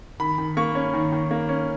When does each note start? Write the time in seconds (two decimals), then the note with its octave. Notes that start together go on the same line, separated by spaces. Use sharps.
0.20 D#3 B5
0.38 D#3
0.57 A#3 C#6
0.75 C#4
0.93 D#3
1.12 D#3
1.31 A#3
1.49 C#4